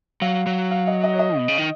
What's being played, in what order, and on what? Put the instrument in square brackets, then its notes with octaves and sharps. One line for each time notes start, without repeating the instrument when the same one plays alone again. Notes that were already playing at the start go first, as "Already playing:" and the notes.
[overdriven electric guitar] F#3 [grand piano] F5
[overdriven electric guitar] F#3
[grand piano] F5
D#5
D#5
C#5
D#5
[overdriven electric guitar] B2
C#3
D#3